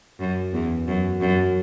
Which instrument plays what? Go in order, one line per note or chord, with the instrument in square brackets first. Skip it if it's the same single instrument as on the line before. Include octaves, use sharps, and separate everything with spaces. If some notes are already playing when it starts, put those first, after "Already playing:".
[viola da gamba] F#2
E2
F#2
F#2